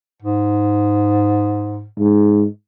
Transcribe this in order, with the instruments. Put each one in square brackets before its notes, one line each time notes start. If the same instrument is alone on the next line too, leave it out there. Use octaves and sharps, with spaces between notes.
[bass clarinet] G#2
[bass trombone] G#2